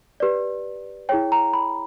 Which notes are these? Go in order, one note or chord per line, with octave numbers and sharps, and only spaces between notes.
G4 B4 D5
E4 G#4 C#5 G5
A#5
B5